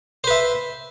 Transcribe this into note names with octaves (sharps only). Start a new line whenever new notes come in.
B4 C5 E5